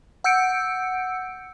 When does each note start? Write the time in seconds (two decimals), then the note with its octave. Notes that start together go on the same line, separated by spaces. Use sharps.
0.24 F#5 E6 G6 C#7 D7